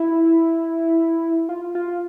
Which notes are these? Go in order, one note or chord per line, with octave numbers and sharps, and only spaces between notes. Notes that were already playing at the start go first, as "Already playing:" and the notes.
Already playing: E4
F4
F4